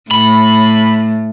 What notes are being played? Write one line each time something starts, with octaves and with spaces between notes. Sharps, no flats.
A2 B5